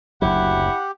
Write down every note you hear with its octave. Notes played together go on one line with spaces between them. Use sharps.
F#1 D2 F#3 E4 G4 F#5